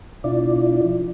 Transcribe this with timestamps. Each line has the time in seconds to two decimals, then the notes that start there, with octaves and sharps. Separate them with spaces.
0.24 B2 D4 E4 F4 D5
0.84 F3